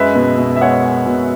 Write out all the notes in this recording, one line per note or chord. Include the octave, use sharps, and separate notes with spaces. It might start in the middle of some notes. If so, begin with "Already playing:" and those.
Already playing: F#2 G#3 B4 E5
B2
B2
E5
G#3 C#5 F#5
G#3
B2